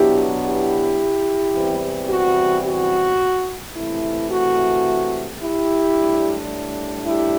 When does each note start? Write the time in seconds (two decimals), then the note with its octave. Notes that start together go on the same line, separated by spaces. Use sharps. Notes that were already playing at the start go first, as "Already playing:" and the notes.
Already playing: B2 F#3 B3 D4 E4 G4
0.43 E4 G4
1.54 E2 C3 E3 G3 C4
2.08 F#4
2.65 F#4
3.74 C3 E3 A3 E4
4.30 F#4
5.40 E4 G4
5.95 A2 G3 D4
7.05 E4 G4